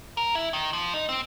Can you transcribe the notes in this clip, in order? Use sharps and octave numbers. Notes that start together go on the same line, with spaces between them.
A#4
E4
D#3
F3
D#4
C4